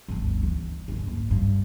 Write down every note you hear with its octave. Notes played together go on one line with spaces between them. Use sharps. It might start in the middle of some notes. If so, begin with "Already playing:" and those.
G1 D2
E3
D3 D#4
F#1 G#2
G2